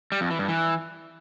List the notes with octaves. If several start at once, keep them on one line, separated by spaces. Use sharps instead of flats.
G3
F2
E3
G2
E3